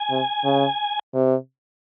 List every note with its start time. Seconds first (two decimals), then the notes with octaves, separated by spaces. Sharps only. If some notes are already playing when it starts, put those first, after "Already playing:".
Already playing: G#5
0.10 C3
0.44 C#3
1.14 C3